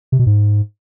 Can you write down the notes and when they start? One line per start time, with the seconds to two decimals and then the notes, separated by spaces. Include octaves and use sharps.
0.12 C3
0.19 B2
0.26 G#2